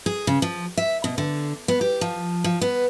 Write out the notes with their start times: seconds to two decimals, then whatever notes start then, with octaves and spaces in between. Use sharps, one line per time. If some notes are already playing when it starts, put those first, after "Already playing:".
0.06 G#4
0.27 C#3
0.42 F3
0.77 E5
1.04 B2
1.18 D3
1.68 B3
1.81 G4
2.01 F3
2.44 F3
2.61 B3